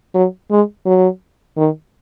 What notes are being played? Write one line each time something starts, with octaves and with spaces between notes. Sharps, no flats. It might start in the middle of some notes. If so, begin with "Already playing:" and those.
F#3
G#3
F#3
D#3